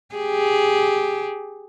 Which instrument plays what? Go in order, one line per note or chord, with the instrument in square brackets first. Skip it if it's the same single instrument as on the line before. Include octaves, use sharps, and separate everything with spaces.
[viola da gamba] G4 G#4